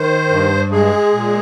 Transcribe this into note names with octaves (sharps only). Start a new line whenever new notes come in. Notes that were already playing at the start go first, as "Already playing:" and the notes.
Already playing: D#3 C5
G2
G#3 G#4
A#2